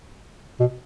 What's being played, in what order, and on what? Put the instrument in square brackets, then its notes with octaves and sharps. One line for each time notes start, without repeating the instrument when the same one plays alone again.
[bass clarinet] B2